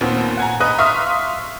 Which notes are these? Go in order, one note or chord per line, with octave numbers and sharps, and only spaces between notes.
D#2 A#2 B3 C4
F#5 G#5 A#5
B4 D#5 A#5 D#6 F#6
E5 F5 C6 C#6 D#6 F6